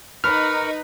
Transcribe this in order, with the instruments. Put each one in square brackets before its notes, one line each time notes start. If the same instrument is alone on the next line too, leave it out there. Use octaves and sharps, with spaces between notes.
[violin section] D#4 [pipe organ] A#4 C#6 [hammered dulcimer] B4 [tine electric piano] F6